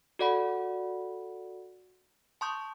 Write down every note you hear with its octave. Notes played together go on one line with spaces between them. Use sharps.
F#4 A4 D5 F#5 B5
A5 C6 C#6 D#6 G6